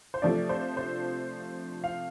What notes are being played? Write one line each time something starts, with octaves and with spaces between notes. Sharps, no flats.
C5
C3 F3 A3 D4 D5
C5
C5
F5